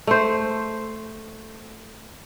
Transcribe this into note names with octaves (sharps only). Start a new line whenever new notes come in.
A3 C5